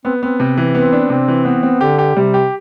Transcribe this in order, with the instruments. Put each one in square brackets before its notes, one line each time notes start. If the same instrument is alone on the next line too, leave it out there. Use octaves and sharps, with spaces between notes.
[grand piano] B3 [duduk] C4
[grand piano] B3 [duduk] C4
[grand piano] C3
E3
[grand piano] B3 [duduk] C4
[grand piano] D4
[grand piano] C3 [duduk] C4
[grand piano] E3
[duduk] B3 [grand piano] C4
[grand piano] C4
[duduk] D3 [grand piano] G4
[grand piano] G4
[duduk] C3 [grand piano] G3
[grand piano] G4